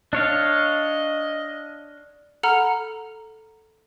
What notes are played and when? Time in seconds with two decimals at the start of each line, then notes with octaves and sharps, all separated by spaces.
0.13 D4 C#5 D#5 F5
2.43 A4 F#5 A#5 B5 F6